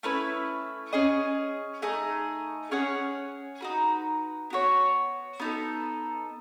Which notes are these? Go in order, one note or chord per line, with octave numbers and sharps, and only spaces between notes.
A3 C#4 E4 B4
C#4 G#4 D#5
A3 D#4 G#4 D#5
C#4 G#4 C#5 F#5
D#4 F#4 B4
B3 F#4 C#5
B3 D#4 A4